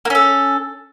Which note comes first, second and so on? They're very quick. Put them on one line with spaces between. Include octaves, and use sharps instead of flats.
A#3 C#4 A4